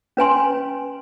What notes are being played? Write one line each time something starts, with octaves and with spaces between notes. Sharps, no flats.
C#4 B4 G#5 C6